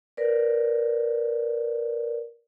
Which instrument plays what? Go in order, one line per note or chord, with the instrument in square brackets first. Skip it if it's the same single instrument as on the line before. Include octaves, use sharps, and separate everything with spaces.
[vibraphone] A#4 B4 D5